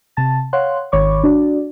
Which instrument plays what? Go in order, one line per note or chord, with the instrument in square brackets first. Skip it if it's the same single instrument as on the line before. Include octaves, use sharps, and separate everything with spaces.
[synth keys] C3 A5 A6
C#5 F5 F#5 C6 F#6
G#1 D#3 C#5 B5 C#6 D6
D4 F#4 D5